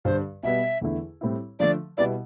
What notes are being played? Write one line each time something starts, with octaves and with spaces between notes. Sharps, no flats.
G2 D3 G3 C5
B2 G3 B3 E5
E2 D3 A3 E4
A2 G3 C4 E4
D3 F3 A3 D5
B2 G3 B3 E4 D5